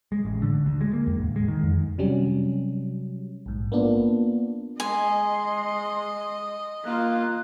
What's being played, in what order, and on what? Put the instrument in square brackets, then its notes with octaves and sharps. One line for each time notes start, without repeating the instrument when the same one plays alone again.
[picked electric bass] G#3
A1
D3
D2
G#3
A#3
E2
D1
G#3
D#3
F2
[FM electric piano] C3 F#3 G3 C#4
A#1 G#2
A#3 B3 D4 F4
[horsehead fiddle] G#3 [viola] D#5 [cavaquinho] G#5 [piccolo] C6
[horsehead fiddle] A#3 F4 [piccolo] F#6